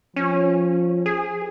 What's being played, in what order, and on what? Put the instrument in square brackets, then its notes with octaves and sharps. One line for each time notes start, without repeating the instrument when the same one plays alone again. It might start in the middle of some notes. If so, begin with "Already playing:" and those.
[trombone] F3 [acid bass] C#4
[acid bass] G#4